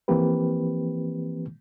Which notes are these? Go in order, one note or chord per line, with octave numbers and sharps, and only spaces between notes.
E3 F3 A#3 C4 G4 B4